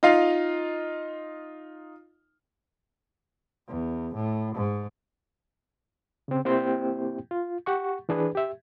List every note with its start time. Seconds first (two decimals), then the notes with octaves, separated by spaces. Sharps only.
0.03 D#4 F4 F5
3.68 E2
4.14 A2
4.55 G#2
6.28 C#3 C4
6.45 A#3 C4 E4 G4 C5 G5
7.31 F4
7.66 G4 F#5 C#6
8.09 E3 D4 G#4 B4
8.35 G4 E5